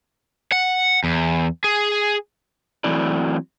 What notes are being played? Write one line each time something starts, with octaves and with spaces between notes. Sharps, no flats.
F#5
E2
G#4
E3 F#3 A3 C4 E4 D5